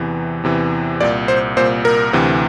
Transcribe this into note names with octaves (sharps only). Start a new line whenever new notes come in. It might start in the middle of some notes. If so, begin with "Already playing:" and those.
Already playing: E2 C3 E3
E2 C3 E3
C2 A#2 D5
C5
C2 A#2 C5
A#4
D2 C3 E3